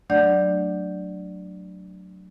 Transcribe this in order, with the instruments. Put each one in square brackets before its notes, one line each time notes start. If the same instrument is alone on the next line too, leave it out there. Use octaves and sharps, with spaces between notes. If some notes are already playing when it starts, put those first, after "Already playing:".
[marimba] F#3 A3 D4 D5 F#5 G6